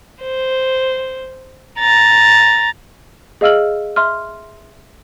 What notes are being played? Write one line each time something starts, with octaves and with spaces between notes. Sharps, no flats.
C5
A#5 A6
G#4 D#5 F5 E6 F6 F#7
E5 C6 F6